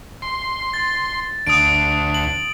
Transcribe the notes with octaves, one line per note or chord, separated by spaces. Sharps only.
C6
A6
D2 D#6 D7
F#7